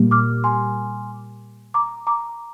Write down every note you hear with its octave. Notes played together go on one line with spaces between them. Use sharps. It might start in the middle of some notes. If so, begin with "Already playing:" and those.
Already playing: A#2 G3 A#3
D6 F6
G#5 C6
A#5 D6
A#5 D6